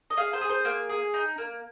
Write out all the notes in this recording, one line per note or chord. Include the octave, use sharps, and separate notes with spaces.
D#5
G#4 F5
C5
G#4
C5
A#3
G#4
D#4
A#3